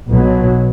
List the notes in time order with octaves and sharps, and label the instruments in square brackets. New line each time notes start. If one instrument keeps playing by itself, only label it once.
[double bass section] B1 B2 F#3